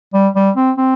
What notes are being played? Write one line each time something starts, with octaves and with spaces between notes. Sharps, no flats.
G3
G3
C4
C4